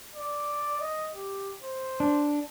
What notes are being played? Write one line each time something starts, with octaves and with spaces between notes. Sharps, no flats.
D5
D#5
G4
C5
D4